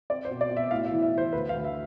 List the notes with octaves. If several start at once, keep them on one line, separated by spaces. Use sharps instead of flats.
C4 D5
C5
B2
D5
B2
E5
A2 F5
E5
E3
E5
E3
C5
D2 B4
F5
D2
E5